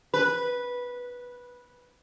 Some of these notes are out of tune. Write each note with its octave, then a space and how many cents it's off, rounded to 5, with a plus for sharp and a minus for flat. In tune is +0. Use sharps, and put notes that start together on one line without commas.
B4 -10